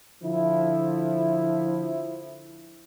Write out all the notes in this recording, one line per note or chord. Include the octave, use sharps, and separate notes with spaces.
D3 F3 E4